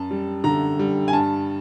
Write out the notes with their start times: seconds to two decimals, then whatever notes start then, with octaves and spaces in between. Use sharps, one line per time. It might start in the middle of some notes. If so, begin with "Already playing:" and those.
Already playing: F#2 A5
0.11 G3
0.44 D3 A#5
0.79 G3
1.08 G#5
1.13 G2 A5